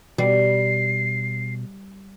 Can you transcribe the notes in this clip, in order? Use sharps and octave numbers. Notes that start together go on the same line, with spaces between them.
B2 G3 C7